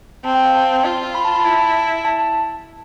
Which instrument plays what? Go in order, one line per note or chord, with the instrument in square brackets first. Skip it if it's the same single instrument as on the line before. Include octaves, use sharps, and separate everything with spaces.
[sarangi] C4 [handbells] A5
[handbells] G5
F5
A5
[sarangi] F4
[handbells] B5
A5
B5
[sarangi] E4 [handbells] A5
[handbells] A5